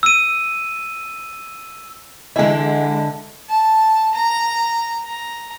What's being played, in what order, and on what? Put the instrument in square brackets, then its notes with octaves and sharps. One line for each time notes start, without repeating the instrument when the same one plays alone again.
[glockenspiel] E6 D#7
[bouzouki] D3 E4 [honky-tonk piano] E3 G#3 [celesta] D#5
[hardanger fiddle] A5
A#5
A#5